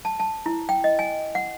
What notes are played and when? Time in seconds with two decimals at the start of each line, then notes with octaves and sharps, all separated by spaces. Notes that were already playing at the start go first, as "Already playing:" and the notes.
0.05 A5
0.20 A5
0.46 E4
0.69 G5
0.84 D#5
0.99 G#5
1.35 F#5